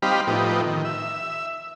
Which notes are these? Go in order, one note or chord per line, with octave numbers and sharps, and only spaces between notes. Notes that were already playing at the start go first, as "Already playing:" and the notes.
G3 C4 D#4 G4 F5 B5
A2 F3 B3 D#4 G4
D#3
E5